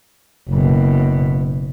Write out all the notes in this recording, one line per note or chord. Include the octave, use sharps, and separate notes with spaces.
F#1 B2